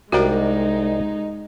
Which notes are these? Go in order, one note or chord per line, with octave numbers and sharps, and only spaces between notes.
C2 G#3 D4 D#4 F#4 A#4 G5 A#5